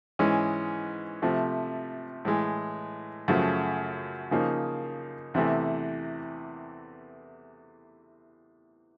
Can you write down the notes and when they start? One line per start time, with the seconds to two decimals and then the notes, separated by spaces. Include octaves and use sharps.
0.19 G#2 E3 G#3 C#4
1.22 C3 F3 A3
2.25 A2 E3 G#3
3.28 F#2 C#3 F3 A3
4.31 C#3 F3 A#3 D#4
5.34 E2 C3 E3 A3